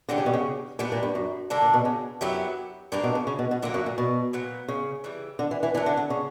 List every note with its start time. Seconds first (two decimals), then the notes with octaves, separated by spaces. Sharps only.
0.09 D3 E3 G3 C#4 G4
0.18 C#3
0.26 B2
0.34 C#3
0.79 A#2 G3 B3 D4
0.92 A#2
1.03 G2
1.15 F#2
1.50 G2 D3 A#3 D4
1.62 A#2
1.74 B2
1.85 C#3
2.21 F#2 F#3 B3 E4 G4
2.92 G2 A#2 A#3 D4 A#4
3.03 B2
3.15 C#3
3.27 C#3
3.39 B2
3.51 B2
3.62 A#2 D3 F#3 A#3
3.74 F#2
3.86 A#2
3.98 B2
4.33 A#2 F#3 B3
4.68 C#3
5.04 C#3 E3 G3
5.39 D3
5.51 E3
5.63 E3
5.75 E3 F#3 B3 D4
5.86 D3
5.97 D3
6.10 C#3